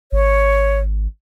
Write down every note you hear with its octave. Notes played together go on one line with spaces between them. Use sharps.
G#1 C#5